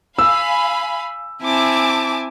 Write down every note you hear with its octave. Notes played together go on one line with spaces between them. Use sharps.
F5 G#5 B5 E6
C4 E4 G#5 A5 D6